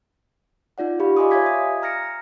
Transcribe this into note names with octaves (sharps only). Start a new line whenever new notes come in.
D#4 F4 D5 F#5
F4 G4 F5 B5
D#5 F5 G#5 C6 D6 D#6
C#5 E5 F5 G#5 G#6 B6
D#6
A#5 F6 A#6 C#7 D7